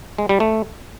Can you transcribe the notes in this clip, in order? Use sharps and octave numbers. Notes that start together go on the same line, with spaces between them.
G#3
G3
A3